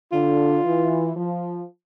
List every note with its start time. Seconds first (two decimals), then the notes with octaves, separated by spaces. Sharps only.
0.12 D3 F4
0.64 E3
1.16 F3